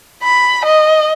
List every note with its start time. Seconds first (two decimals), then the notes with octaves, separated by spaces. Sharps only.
0.23 B5
0.65 D#5